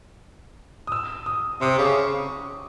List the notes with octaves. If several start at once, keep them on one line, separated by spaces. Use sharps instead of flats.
D#6
E6
D#6
C3 D#6
C#3 D6
C#6